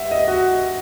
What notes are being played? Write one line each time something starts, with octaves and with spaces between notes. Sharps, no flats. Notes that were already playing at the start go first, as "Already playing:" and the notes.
Already playing: G3 E5 F#5
D#5
F#4